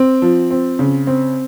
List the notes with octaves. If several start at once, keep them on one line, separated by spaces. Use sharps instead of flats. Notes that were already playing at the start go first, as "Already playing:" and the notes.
Already playing: C4
F3
C4
C#3
C4